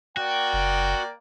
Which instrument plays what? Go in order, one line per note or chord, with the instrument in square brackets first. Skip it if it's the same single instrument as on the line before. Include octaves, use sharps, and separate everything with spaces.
[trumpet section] A#3 D5 G5 [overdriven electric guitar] F#4
[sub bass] F#1